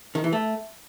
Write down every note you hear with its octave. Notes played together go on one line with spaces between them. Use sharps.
D#3
E3
A3